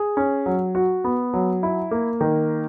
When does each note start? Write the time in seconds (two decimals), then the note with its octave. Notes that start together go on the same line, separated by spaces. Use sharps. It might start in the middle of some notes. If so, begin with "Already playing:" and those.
Already playing: G#4
0.17 C#4
0.46 F#3
0.75 F#4
1.04 B3
1.34 F#3
1.63 E4
1.91 A#3
2.21 D#3